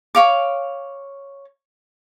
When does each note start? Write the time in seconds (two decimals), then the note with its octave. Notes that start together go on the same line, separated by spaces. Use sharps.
0.15 C#5 F5 D6